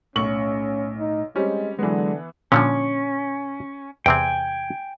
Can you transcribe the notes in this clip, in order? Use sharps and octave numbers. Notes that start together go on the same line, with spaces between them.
B1 A2 C#4 C#6 F#7
D#4
G3 G#3 C4 C#4
D3 E3 F#3 G#3 B3
A#2 D3 F3 C#4
E2 C3 C4 G5 G#5